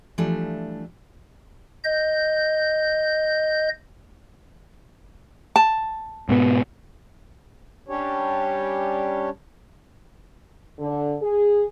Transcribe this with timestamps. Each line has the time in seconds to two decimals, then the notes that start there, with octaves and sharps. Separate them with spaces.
0.18 E3 F3 G3 A3 D4
1.84 D#5 G6
5.56 A5
6.29 G#2 B2 B3
7.88 G3 C#4 D4 G4 C#5
10.79 D3
11.21 G#4